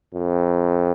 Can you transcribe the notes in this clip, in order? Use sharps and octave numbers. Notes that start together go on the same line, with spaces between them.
F2